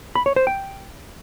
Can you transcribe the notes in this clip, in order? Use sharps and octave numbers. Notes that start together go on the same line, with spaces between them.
B5
C#5
C5
G5